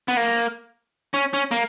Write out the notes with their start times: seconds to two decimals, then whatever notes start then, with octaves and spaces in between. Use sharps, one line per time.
0.08 B3
0.17 A#3
1.14 C#4
1.33 C#4
1.51 A#3